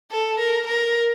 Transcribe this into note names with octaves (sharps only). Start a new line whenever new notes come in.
A4
A#4
A#4